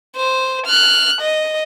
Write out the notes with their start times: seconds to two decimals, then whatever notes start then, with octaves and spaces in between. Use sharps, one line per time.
0.16 C5
0.66 F6 F#6
1.21 D#5